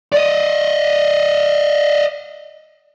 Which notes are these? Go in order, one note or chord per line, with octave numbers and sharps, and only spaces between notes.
D5 D#5